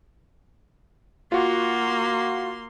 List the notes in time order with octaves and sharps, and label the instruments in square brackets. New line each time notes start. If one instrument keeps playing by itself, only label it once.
[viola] A#3 C6 [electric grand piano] F4 F#4